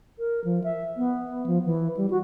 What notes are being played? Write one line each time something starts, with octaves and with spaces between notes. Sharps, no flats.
A#4
F3
E5
B3
F3
E3
G3
F#4